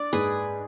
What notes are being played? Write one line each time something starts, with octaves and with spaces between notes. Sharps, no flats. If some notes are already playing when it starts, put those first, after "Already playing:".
Already playing: D4 D5
G#2 G#4 B4